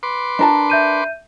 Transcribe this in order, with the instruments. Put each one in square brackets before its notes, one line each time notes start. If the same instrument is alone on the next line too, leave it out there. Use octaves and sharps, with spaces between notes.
[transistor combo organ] B4 C6 D6
[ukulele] D4 A#4 A5
[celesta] E5 G6 D#7